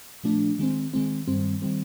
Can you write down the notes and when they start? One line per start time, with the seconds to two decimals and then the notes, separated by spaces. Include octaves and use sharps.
0.24 A#2 F3 A3 D4
0.59 D#3 G#3 C4
0.94 D#3 G#3 C4
1.28 G2 D#3 G3 C4
1.62 D#3 G3 C4